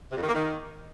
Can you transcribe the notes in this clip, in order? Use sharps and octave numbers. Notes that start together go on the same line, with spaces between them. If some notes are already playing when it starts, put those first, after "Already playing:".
C3
F2
D#3
A#3
D#3